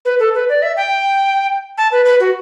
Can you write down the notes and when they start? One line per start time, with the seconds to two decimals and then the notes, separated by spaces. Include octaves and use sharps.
0.05 B4
0.20 A4
0.35 B4
0.49 D5
0.62 E5
0.77 G5
1.78 A5
1.92 B4
2.06 B4
2.20 F#4